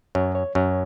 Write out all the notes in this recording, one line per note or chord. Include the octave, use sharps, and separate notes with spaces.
F#2 C#5
C#5
F#2 C#5